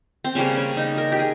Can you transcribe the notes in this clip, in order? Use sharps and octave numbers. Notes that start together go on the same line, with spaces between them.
C4
C#3 G3 A#3 C#4
C#4
D#4
A#4
G4
G#4